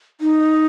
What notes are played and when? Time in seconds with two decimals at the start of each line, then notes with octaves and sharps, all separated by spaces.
0.21 D#4